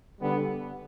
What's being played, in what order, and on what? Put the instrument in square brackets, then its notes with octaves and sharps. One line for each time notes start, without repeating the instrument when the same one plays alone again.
[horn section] D3 G3 B3